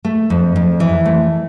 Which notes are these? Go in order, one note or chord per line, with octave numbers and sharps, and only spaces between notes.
A3
F2
F2
E3
A3